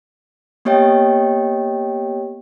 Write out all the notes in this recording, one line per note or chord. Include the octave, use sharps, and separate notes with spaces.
A#3 B3 G4 C#5 D#5 G5